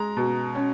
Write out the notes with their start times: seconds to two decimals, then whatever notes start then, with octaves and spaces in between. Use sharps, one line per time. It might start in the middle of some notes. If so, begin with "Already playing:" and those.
Already playing: G#3 A#5
0.17 B2
0.55 C#4